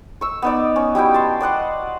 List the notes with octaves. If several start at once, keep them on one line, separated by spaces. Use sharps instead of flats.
C#6 E6
B3 D#4 D5
C#4
G3 E4 F#4 G5
A5 C6
D5 D#5 F#5 C6